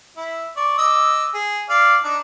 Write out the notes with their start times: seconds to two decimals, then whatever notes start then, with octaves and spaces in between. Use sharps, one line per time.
0.17 E4
0.56 D5 C#6
0.78 D#5 D6 E6
1.34 G#4
1.69 D5 F5
2.04 D4 D#4